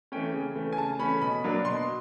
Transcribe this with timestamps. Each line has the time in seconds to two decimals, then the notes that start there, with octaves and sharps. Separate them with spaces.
0.12 E3 A3 C#4 G5
0.34 C#3
0.56 E3 A3 C#4
0.73 G#5
0.78 C#3 A5
0.99 E3 A3 C#4 B5
1.21 B2 B5
1.44 F#3 A#3 D4
1.65 B2 C6